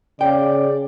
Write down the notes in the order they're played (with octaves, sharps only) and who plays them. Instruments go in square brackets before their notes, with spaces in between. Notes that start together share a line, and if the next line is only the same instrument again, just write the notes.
[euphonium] C#3 [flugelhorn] D5 [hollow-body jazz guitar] F5 G5